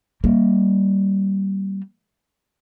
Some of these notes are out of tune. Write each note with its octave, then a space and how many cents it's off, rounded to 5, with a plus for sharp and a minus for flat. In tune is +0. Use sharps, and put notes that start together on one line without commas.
G3 -15 A#3 +0